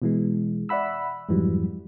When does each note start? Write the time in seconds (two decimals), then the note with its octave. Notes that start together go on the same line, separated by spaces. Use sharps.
0.02 B2 E3 G#3
0.69 D5 E5 F#5 B5 E6
1.29 F2 G#2 E3 F#3 G3